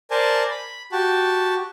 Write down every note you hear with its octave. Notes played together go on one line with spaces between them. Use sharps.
A#4 C5 D5 G#5 A5
B5
F#4 G4 A5